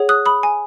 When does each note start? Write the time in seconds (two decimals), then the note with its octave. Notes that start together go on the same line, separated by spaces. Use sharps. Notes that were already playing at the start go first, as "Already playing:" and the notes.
Already playing: G#4 C#5 F#5
0.09 D#6 F#6
0.26 B5 D#6
0.43 G#5